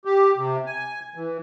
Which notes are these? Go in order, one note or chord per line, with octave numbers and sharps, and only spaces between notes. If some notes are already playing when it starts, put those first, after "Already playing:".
G4
C3
G#5
E3